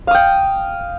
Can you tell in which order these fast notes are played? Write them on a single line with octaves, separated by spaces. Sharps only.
F5 D#6 G5